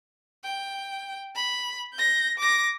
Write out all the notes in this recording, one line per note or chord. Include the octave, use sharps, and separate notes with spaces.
G5
B5
G6 A#6
D6 A#6